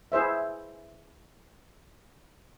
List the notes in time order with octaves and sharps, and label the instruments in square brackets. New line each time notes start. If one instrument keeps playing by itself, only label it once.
[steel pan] E4 G#4 C5 E5